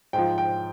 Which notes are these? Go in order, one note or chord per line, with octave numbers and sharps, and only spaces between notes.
G#2 F3 G5
G5